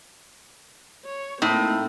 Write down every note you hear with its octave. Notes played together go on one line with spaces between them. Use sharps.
C#5
A2 A#3 C4 D#4